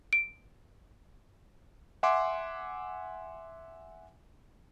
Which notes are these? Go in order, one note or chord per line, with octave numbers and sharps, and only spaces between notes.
D7
E5 F#5 G#5 C6 D6